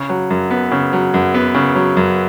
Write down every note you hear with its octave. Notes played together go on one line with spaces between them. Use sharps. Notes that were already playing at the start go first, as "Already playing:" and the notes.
Already playing: C#3
F#3
F#2
B3
C#3
F#3
F#2
B3
C#3
F#3
F#2